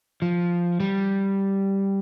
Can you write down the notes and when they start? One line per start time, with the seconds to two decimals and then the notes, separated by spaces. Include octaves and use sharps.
0.22 F3
0.80 G3